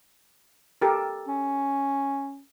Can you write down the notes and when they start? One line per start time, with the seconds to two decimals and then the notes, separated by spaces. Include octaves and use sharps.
0.82 G4 A4 A#4
1.28 C#4